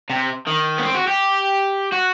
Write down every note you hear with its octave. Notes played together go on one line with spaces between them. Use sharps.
C3
D#3
B3
C4
F#4
G4
F#4